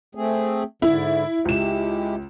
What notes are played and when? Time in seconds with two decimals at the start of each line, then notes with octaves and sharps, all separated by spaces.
0.15 A3 C4 G#4
0.82 G#2 D3 E4
1.45 C#2 G#3 E4 G4 E7